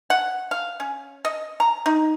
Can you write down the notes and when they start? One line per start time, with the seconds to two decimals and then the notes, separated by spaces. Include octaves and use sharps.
0.10 F#5
0.51 F5
0.80 C#4
1.25 D#5
1.60 A#5
1.86 D#4